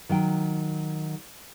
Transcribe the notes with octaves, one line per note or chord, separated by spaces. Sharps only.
D#3 F#3 G5